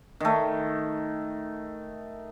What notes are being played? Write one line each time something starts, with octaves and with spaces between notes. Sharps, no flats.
D#3 A3